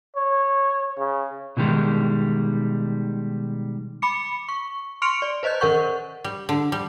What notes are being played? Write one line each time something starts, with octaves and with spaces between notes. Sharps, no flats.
C#5
C#3
B2 D3 D#3 G3 G#3
B5 D6 C#7
C#6
C6 C#6 F6 C#7 D7 F7
D5
B4 C5 D#5 F#6 G6
D#3 A#4 F#5 C#6 G6
G3
D3
G3